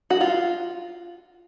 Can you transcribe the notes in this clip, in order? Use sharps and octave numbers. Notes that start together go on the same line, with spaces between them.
F#4
F4